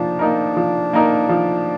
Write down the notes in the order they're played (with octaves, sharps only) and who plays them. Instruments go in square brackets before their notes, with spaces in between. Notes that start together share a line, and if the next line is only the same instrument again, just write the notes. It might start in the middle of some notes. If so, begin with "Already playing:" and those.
Already playing: [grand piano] F3 A#3 D#4 [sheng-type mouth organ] D4
[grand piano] A#3 D#4 A#4
F3
A#3 D#4 A#4
F3